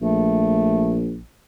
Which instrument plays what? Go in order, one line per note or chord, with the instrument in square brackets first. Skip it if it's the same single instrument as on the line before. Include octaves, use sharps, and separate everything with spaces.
[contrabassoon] A#1 [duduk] A3